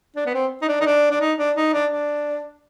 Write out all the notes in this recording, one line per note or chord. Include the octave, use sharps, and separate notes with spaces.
D4
B3
C4
D#4
D4
D#4
D4
D4
D#4
D4
D#4
D4
D4